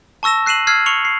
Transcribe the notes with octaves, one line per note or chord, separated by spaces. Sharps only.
A5 C#6 E6 A#6 E7
F#6 C7 D#7 E7 F#7
E6 F6 G#6 C7
C#6 C#7 F7 F#7
C7